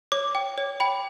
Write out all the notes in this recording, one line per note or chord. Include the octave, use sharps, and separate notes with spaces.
C#5 D6
G5
C#5
G5 B5